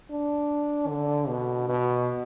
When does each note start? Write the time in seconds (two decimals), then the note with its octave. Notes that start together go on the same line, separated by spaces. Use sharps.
0.10 D4
0.88 D3
1.28 B2
1.68 B2